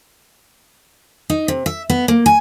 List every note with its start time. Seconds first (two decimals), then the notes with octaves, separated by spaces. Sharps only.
1.30 D#4
1.48 C3
1.66 E5
1.90 B3
2.08 A#3
2.26 G#5